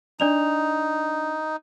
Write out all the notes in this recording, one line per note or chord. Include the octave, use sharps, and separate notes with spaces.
D4 D#4 D5 F7